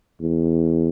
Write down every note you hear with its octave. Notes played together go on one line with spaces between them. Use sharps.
E2